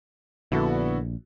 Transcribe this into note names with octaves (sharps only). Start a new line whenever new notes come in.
A#1 D3 B3 E4 F#4 A4